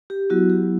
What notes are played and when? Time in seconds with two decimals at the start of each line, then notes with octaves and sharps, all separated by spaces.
0.10 G4
0.30 F#3 B3 E4 F#4
0.50 G4